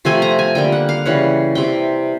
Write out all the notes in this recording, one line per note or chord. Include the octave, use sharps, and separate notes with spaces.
C3 F3 A3 C4 G#5
A#5
G#5
D3 G3 A#3 G5
F#5
F5
C#3 E3 G3 F#5
C3 E3 G3 G5